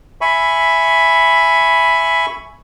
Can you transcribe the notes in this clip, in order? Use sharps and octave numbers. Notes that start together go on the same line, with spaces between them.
E5 G#5 B5 C#6